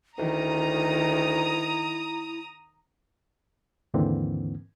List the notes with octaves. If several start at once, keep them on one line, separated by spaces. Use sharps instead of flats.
D2 D#3 E4 A#5 D#6
D#2 G#2 D3 E3 A#3 C4